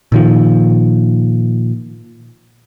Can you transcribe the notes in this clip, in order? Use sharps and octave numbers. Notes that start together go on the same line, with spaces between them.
A#2 D#3 F3